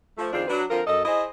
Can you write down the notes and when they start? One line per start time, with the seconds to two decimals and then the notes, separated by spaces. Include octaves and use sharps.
0.18 F3 A3
0.33 F2 D#3 C4 D4 F4 G#4
0.49 F#3 D4 B4
0.70 D3 F3 C4 F4 A#4
0.87 F#2 A4 D#5
1.05 E4 G#4 C5 D#5